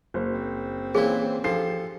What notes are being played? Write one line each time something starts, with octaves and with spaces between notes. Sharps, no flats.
F#1 C5
C4
A#2 E3 C#4 E4 G#4
F3 D4 G4 A4 C7